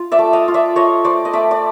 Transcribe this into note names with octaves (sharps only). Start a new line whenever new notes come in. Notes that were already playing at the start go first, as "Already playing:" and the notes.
Already playing: F4
D5 E5
A3
D#5 F5
F4
D5 E5
F4 C#5 D#5
A3 C5 D5
D#5
A3 D5 E5
D5